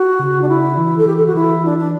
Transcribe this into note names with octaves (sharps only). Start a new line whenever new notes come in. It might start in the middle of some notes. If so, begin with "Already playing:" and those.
Already playing: F#4
C#3
D4
E4
E3
A4
E3 G4
A4
F#4
E3 E4
D4
D4